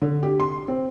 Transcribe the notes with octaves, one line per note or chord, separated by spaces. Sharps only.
D3
G4
C6
C4